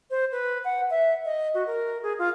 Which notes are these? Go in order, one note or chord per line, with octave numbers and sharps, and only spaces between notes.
C5
B4
F#5
E5
D#5
F#4
A#4
G#4
F4